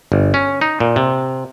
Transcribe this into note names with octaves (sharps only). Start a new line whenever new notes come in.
G1
C#4
D#4
A#2
C3